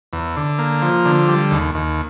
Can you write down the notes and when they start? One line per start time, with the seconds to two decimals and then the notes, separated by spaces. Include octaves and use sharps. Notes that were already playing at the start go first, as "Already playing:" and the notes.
0.13 E2
0.37 D3
0.59 A#3
0.82 F3
1.05 D3
1.28 G3
1.51 D#2
1.75 D#2